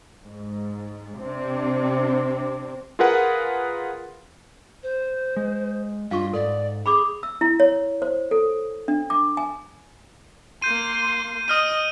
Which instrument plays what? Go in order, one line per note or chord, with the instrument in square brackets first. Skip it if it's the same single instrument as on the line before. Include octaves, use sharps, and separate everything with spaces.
[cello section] G#2
C3 C4 D4
[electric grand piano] F4 G#4 A#4 B4 F#5
[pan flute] C5
[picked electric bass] G#3
[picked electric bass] G2 [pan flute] F4 [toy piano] F5 C#6
[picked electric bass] G#2 [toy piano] A4 [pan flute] D5
[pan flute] G#4 [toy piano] B5 C#6 D6
[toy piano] E6
E4
C#5
C5
A4
D4
D6
G#5
[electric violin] A#3 C6 [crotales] G6 D#7
[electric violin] D#5 [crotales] D#6 F6 D#7